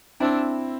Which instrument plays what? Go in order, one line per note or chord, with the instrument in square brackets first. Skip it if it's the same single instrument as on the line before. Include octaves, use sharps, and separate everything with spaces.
[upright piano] C4 E4 [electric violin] D4